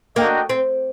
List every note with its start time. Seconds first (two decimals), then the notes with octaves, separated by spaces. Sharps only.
0.16 A#3 D4 F#4 A#4 D#5 G5
0.49 C4